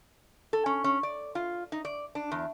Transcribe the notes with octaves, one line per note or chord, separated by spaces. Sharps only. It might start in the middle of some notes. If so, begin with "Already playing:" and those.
A4
C#4
C#4
D5
F4
D#4
D5
D4
E2